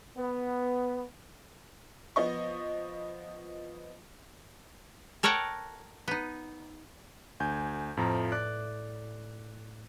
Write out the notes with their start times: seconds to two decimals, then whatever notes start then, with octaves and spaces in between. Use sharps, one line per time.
0.17 B3
2.16 F3 B3 D#5 C#6
5.23 A4 A#4 C#5 D#5 F#5 G5
6.08 B3 D#4
7.40 D2 G#5 G6
7.97 F2 A2 F3 A#5
8.32 D5 F#6